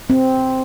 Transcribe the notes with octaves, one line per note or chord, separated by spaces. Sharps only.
C4